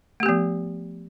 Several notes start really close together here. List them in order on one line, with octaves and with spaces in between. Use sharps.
A3 G4 B3 F3